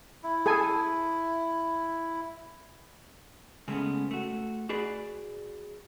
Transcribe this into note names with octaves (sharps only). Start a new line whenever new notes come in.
E4
G#4 A4 G#5
C#3 G#3 A3 B3 C#4
A3 F#4
F#4 G#4 B4 D5